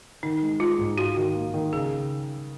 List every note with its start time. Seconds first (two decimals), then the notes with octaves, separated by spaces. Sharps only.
0.23 D#3 D#4
0.42 G#3
0.60 G#3 F4
0.78 G#2
0.98 F4 F#4
1.16 D#3
1.35 A#3
1.54 D#3
1.73 C#3 G#4